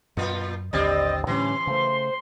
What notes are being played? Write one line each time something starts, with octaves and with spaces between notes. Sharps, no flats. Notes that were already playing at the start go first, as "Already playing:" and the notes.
F#2 A#2 F4
A1 D#2 D3 G3 C4 D#5 A6
A2 D3 E3 G3 C#4 C6
C#3 A3 C5